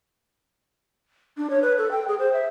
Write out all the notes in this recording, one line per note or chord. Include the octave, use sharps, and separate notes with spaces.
D4
C#5
B4
A4
G5
G#4
C5
E5